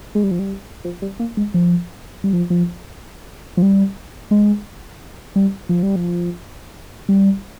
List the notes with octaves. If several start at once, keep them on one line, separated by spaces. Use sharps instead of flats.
G#3
G3
F3
G3
F3
G3
A#3
G#3
F3
G3
F3
F3
F3
G3
G#3
G3
F3
G3
F3
G3